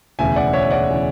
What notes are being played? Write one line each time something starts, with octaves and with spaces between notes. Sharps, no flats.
E1 D2 C#3 E3 E5 G#5
D5 F#5
C#5 E5
D5 F#5
C#3 E3